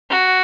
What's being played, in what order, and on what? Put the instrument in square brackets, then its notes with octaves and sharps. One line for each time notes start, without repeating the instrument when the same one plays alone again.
[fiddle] F#4